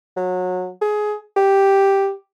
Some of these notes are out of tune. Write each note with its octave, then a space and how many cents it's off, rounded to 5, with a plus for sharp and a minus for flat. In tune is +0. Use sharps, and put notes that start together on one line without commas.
F#3 -25
G#4 +20
G4 +0